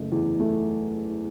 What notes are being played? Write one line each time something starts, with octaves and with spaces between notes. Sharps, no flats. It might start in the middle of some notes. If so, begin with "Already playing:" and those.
Already playing: F#1 A3
E2
A3